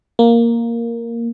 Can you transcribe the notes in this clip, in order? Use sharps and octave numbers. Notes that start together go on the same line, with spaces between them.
A#3